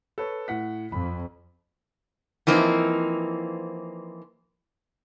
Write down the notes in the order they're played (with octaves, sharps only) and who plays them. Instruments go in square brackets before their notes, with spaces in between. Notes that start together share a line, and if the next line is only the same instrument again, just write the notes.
[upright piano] A4 B4 C#5
A2 F#5 B6
[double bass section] F2 [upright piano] B5
[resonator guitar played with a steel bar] E3 F3 A#3 C4 D#4